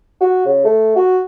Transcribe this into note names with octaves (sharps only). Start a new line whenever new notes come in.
F#4
C#3
A3
F#4